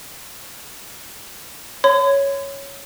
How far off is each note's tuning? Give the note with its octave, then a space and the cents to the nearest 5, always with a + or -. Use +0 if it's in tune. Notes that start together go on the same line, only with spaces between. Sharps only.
C#5 +0 C6 -45